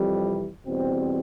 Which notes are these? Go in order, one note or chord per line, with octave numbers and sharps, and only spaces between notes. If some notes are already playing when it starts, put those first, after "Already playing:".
Already playing: F2 C3 E3 G3
E2 B2 G3 C4